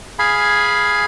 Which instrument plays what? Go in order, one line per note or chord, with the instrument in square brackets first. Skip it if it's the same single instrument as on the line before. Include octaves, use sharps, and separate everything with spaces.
[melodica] G#4 F5 G#5 B5